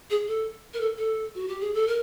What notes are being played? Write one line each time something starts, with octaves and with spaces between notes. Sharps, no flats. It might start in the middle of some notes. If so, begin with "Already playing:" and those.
G#4
A4
A#4
A4
A4
F#4
G4
G#4
A4
A#4